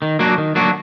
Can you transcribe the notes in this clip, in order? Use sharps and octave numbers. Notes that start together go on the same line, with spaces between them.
D#3
F#3 A#3 D4 F#4
D#3
F#3 A#3 D4 F#4